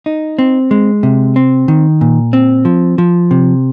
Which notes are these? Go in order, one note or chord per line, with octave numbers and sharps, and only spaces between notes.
D#4
C4
G#3
C3
C4
D#3
A#2
C4
F3
F3
C3